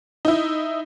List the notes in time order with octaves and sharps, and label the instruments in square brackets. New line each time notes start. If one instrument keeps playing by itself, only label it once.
[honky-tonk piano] D#4 E4